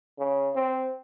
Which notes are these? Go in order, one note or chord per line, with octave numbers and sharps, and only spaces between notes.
C#3
C4